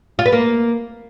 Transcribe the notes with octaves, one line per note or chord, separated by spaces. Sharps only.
F4
B4
A#3